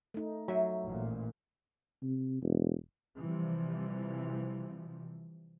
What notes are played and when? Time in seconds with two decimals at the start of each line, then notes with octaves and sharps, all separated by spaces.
0.14 A3 D#4
0.48 F2 F#3 E5
0.84 A1 A#2
2.03 C3
2.42 E1
3.19 C3 E3 F3 G3